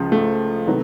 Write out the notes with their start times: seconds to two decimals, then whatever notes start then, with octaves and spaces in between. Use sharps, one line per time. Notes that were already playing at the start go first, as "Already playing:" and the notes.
Already playing: C#2 C#3 F3
0.12 A3
0.66 C3 D#3 F#3 B3